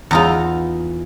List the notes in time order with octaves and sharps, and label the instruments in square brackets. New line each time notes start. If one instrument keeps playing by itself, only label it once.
[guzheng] E2 D#4 F4